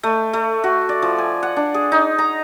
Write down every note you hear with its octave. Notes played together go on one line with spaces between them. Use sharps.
A3
A3
F#4
D5
F3
G#5
F#5
D4
G#4
D#4
A#5